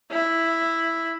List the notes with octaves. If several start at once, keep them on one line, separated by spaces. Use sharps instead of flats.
E4